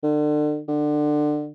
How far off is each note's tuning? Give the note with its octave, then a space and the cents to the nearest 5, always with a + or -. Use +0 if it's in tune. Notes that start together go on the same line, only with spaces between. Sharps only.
D3 +35
D3 +25